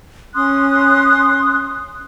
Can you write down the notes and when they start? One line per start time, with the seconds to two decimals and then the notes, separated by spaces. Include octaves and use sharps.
0.34 C#4 C6 D#6 F#6